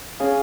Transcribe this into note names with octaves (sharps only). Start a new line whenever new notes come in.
C#4 G#4 C#5 F5 G#5